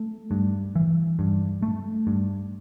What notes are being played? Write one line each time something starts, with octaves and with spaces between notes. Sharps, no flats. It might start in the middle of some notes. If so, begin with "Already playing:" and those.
Already playing: A3
G2
E3
G2
A3
G2